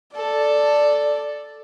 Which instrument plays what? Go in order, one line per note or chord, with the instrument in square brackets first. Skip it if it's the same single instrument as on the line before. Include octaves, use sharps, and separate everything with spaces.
[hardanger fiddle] A4 [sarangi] D5